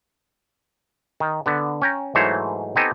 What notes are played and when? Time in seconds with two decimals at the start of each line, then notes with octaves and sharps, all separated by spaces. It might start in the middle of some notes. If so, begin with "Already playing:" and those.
1.20 D#3
1.46 D3 B3
1.82 C#4 G5 A#5
2.15 G#2 E3 F#3 A3 C5 C#5
2.76 B3 C4 D#4 G4 A4 G#5